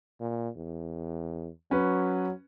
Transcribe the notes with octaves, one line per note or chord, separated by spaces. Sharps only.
A#2
E2
F#3 C#4 B4